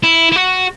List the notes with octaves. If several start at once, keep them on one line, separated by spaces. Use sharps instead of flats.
E4
E4
F#4